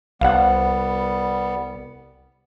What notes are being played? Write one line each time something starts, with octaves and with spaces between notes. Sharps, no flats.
C2 G3 B3 F5 F#5